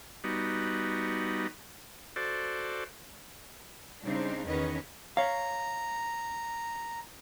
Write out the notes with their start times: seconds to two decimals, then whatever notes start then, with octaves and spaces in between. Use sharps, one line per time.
0.24 G3 B3 D#4 F#4
2.16 F#4 A4 C5 D5
4.03 C#3 G3 C4 D4 D#4 C5
4.46 E2 D#3 C#4 B4 C#5 D#5
5.17 C#5 F5 A#5